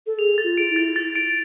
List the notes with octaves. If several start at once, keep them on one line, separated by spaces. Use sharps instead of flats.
A4
G#4 F7
A6
F4
D7
E4
A6
A6
D7